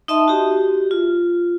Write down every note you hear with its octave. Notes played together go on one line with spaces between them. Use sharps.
D#4 D#5 E5 A5 C6
F#4 G4
F4